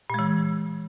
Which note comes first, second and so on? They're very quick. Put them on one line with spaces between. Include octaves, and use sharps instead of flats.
A#2 G#3 E3